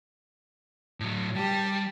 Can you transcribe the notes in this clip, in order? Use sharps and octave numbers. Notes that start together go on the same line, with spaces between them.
A2 F#3
G3 G4 A5